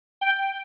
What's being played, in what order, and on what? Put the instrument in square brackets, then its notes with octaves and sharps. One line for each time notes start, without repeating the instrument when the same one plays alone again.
[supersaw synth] G5